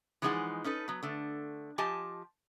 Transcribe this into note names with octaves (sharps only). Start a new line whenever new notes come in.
E3 F3 G#3 D#4 G#4 F#5
C#4 D#4 A4 B4
F#3 B3
D3 A3
F3 G4 D#5 G#5 A5